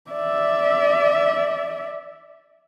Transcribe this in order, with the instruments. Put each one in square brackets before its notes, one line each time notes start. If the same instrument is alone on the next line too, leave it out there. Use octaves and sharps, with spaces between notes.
[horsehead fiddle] D5 E5